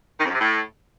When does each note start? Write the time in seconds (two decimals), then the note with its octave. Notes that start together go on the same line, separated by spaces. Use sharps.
0.19 D#3
0.24 F2
0.29 F#2
0.34 C3
0.39 A2